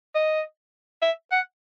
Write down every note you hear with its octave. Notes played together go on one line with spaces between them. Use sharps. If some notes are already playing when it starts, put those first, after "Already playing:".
D#5
E5
F#5